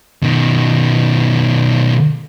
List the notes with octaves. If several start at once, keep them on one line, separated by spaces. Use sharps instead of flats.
B2 D#3